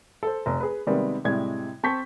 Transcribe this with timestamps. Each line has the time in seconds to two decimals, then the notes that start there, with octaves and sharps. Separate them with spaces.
0.23 A4 C5
0.46 F1
0.60 G#4 B4
0.87 C3 D#3 G3 G#3 A#3 B3
1.24 A2 C3 G3 G#3 G#6
1.83 C4 A5 C#6 G6 B6